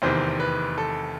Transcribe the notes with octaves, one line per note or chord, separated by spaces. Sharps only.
F1 E2 C3 D#3 C5
B4
A4